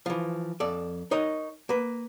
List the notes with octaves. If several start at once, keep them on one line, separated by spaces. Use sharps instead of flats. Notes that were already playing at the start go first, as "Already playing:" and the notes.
E3 F3
F2 A4 D5
D#4 A#4 C#5 D#5
A#3 B4